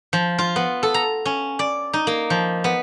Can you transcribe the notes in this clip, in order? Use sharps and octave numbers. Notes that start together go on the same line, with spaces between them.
F3
F4
B3
A4
A#5
C#4
D5
D#4
A#3
F3
B3